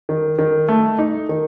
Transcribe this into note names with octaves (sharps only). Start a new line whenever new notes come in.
D#3
D#3
A3
D#4
D#3